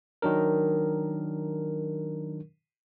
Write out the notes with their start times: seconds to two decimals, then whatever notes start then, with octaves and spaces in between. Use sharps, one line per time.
0.22 D#3 F#3 D4 A#4